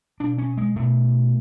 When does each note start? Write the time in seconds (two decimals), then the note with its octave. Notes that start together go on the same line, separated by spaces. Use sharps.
0.20 B2 D4
0.38 C#4
0.57 G#3
0.76 B2 A3